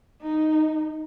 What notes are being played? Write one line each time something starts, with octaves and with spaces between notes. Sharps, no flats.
D#4